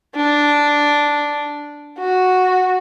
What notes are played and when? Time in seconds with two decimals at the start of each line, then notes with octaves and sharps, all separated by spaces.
0.16 D4
1.99 F#4